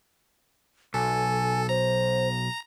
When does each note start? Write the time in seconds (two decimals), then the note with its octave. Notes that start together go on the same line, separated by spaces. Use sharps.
0.94 B1 A4 G#5
1.69 C5 A#5